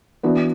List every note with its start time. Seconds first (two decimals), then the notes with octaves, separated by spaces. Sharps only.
0.23 E3 B3 D4 F#4